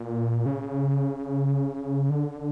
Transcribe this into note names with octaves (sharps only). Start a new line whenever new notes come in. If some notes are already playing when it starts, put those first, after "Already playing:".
Already playing: A#2
C#3
D3